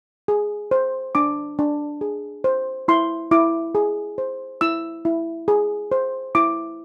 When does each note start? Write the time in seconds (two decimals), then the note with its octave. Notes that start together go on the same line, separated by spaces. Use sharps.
0.28 G#4
0.71 C5
1.15 D4 D6
1.59 D4
2.01 G#4
2.44 C5
2.88 E4 C6
3.31 E4 D6
3.75 G#4
4.18 C5
4.61 E4 E6
5.05 E4
5.48 G#4
5.92 C5
6.35 E4 D6